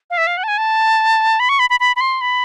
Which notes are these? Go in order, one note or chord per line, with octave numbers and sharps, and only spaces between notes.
F5
E5
F5
F#5
A5
G#5
A5
B5
C#6
B5
B5
B5
B5
C6
B5